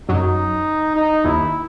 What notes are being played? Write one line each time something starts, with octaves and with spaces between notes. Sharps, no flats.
F#2 F#3 D#4
D#4
D#2 D#3 E4